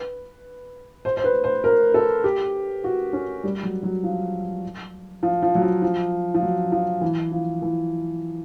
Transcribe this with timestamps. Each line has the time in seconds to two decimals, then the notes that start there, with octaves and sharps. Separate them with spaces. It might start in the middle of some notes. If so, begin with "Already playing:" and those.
Already playing: B4
1.05 C5
1.17 C5
1.24 B4
1.44 C5
1.64 A#4
1.94 A4
2.24 G4
2.84 F#4
3.13 C#4
3.44 G3
3.63 F#3
3.83 F#3
4.04 F3
5.23 F3
5.42 F3
5.55 F#3
5.62 F3
5.82 F3
6.34 F3
6.42 F#3
6.72 F3
7.01 E3
7.32 F3
7.62 E3